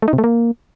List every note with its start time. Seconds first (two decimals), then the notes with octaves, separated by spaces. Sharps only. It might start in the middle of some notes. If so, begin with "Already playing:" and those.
0.02 A3
0.08 D#4
0.13 C3
0.18 A3
0.24 A#3